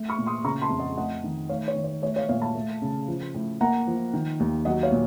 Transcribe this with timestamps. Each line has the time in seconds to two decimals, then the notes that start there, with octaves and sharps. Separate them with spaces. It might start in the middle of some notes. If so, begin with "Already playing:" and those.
Already playing: A3
0.09 C#6 F6
0.18 A#2
0.26 C6 D#6
0.44 C#3 A#5 C#6
0.62 A5 C6
0.70 F2
0.79 D#5 F#5
0.97 A3 D#5 F#5
1.24 D#3
1.49 A3 C#5 F5
1.68 C#5
1.75 D#3
1.84 C#5
2.02 A3 C#5
2.16 C#5 F5
2.29 A#2 C#5 F5
2.41 F5 A5
2.55 A3
2.82 C#3
3.08 F3
3.34 A2
3.61 A#3 F#5 A#5
3.87 F3
4.14 D#3
4.40 D#2
4.65 F#3 D#5 F#5
4.83 C#5 F5
4.92 A#2